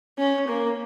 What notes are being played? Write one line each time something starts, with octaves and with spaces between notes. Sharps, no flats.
C#4
A#3